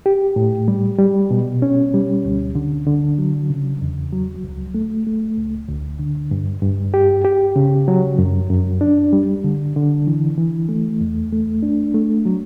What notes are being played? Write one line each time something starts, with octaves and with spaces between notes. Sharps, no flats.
G4
A2
G3
G3
B2
C#4
G3
D2
D3
D3
F#3
C#3
E2
F#3
C#2
A3
A3
C#2
D2
D3
G2
G2
G4
G4
C#3
F#3
F#2
F#2
D4
G3
D3
D3
E3
E3
A3
E2
A3
D4
A3
F#3